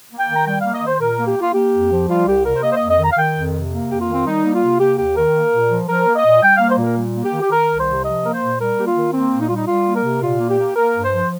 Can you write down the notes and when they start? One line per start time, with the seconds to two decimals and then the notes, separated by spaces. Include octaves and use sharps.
0.10 A#3
0.19 G5
0.28 D#3
0.36 A#5
0.47 G3 G5
0.61 A#3 F5
0.74 D#5
0.83 D#3 C5
1.01 A#2 A#4
1.19 A#3
1.27 G4
1.37 A#3 F4
1.54 A#3 G4
1.72 F2
1.92 F3
2.09 G3 F4
2.27 C2 G4
2.45 C3 A#4
2.55 C5
2.63 A#3 D#5
2.73 C5
2.77 F2 D#5
2.90 D#5
2.99 D#3 A#5
3.12 F5
3.18 D#3 G5
3.36 F2
3.54 C3
3.72 A#3
3.89 F2 G4
3.99 F4
4.08 D#3
4.14 C4
4.26 G3 D#4
4.44 A#3
4.54 F4
4.62 C3
4.80 A#3 G4
4.98 D#2 G4
5.16 D#3 A#4
5.34 A#3
5.52 A#2
5.70 F3
5.89 F3 A#4
6.07 A#3
6.16 D#5
6.25 A#2
6.43 G3 G5
6.57 A#3 F5
6.70 C5
6.79 A#2 A#4
6.97 G3
7.15 A#3
7.25 G4
7.32 D#3
7.42 G4
7.51 D#3 A#4
7.69 C2
7.78 C5
7.87 C3
8.05 F3 D#5
8.24 A#3 A#4
8.33 C5
8.41 A#2
8.59 G3 A#4
8.78 A#3 G4
8.86 F4
8.95 D#3
9.13 A#3 C4
9.32 A#2
9.40 D#4
9.47 G3 F4
9.55 D#4
9.67 G3 F4
9.86 A#3
9.95 A#4
10.04 C3
10.21 A#2 F4
10.40 A#3
10.50 G4
10.59 A#3
10.76 A#3 A#4
10.95 G2
11.04 C5
11.12 F3